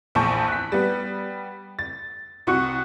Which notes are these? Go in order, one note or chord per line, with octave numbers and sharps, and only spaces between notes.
A#1 E2 A5 C#6 G6
F#6 B6
G3 B3
A6
C2 F#4 C#6 F#6 C#7